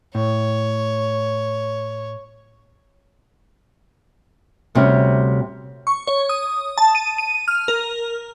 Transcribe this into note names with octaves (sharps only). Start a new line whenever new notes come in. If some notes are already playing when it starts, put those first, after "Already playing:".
A2 C#5
D2 C3 G3 C#4
C#6
C#5
D#6
A5
D#7
D#7
F6
A#4